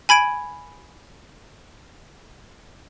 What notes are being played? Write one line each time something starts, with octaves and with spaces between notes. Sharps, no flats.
G#5 B5 G#6 D7